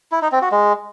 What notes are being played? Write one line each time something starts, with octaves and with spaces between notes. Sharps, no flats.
E4
D#4
C4
F#4
G#3